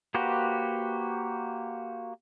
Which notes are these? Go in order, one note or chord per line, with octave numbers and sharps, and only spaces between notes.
A#3 F#4 G4 B4 C5